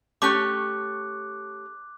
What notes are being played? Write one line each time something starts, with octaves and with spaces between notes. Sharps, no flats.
A3 C#4 G4 D6 F#6